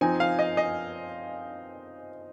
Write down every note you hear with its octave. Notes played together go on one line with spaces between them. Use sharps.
F3 C4 D#4 G#5
F5
D#5
D#5